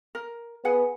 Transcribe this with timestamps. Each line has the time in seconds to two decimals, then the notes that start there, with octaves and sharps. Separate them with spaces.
0.15 A#4
0.65 B3 G#4 F#5 G#5